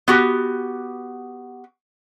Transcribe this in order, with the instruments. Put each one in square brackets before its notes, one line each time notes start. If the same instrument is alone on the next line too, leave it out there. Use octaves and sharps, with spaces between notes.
[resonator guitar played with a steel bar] B3 F#4 G4